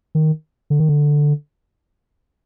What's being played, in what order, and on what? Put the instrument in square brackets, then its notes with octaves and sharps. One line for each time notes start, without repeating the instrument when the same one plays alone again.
[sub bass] D#3
D3
D#3
D3